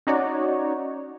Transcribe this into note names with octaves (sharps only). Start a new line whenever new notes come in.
C#4 D#4 F#4 C#5 D5